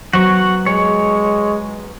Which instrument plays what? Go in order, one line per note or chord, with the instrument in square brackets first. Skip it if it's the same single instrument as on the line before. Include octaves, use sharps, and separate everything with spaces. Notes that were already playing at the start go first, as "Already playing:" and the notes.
[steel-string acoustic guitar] F#3 B3 C5 [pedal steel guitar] F#4 C#6
[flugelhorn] G#3 [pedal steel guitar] C#5